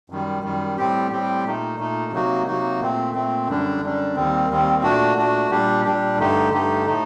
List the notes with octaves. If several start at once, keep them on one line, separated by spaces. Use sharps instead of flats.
F#2 D#3 G3
F#2 D#3 G3
A2 G3 C4 G4
A2 G3 C4 G4
A#2 A3 D#4
A#2 A3 D#4
C3 F#3 A#3 D#4 F#4
C3 F#3 A#3 D#4 F#4
A#2 A3 C4
A#2 A3 C4
F#2 D3 G3 D4
F#2 D3 G3 D4
D#2 D#3 G3 C4
D#2 D#3 G3 C4
A#2 A3 D4 F#4
A#2 A3 D4 F#4
A#2 G3 D4 G4
A#2 G3 D4 G4
G2 D3 A3 D#4 G4
G2 D3 A3 D#4 G4
A2 A3 D#4